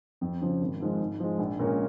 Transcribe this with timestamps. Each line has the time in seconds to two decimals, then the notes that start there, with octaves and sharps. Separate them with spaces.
0.21 F2
0.41 C#3 F3
0.61 G#1
0.80 G#2 F3 G#3
1.00 G#2
1.20 F3 G#3
1.39 A#1
1.59 A#2 G#3 C#4 A#4